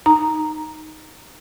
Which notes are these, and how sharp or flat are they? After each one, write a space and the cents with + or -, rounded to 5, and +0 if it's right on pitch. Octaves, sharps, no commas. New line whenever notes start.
D#4 +0 A#5 +0